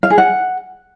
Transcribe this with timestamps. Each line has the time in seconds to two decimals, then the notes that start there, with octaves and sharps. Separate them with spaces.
0.03 F5
0.10 G#4
0.18 F#5